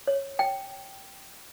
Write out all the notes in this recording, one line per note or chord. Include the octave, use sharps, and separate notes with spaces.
C#5
G5